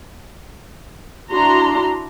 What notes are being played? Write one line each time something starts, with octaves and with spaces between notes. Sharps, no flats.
D4 E4 F#4 A#5 C6